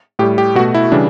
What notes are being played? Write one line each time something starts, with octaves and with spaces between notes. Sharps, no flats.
A2 G3 G4
G4
B2 A3 F#4
E4
C#3 E3 G3 D4